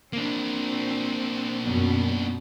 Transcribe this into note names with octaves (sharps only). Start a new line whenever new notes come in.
A#3 C4 D4
F#2 B2